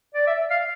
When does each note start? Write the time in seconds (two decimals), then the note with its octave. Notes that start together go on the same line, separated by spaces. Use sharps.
0.14 D5
0.27 E5
0.50 F5